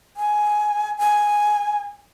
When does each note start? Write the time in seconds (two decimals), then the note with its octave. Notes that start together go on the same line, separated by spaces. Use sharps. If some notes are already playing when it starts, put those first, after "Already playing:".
0.17 G#5
0.99 G#5